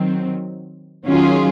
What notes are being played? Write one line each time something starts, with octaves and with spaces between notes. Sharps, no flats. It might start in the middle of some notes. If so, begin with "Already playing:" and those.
Already playing: D#3 F#3 C4
D#3 F#3 C#4 F4 G#4